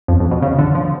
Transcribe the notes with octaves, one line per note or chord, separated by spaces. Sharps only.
F2
F2
B2
C#3
D3
F3